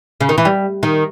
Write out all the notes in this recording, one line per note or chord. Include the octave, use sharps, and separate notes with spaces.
C#3
D#3
E3
G3
D#3